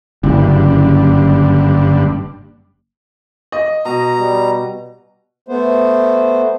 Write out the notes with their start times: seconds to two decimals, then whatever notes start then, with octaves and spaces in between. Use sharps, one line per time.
0.24 F#1 G2 D3
3.52 D#5
3.85 B2 A#5
4.20 G3
5.48 A3 B3 C5